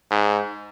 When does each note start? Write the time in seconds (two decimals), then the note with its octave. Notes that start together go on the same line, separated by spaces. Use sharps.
0.11 G#2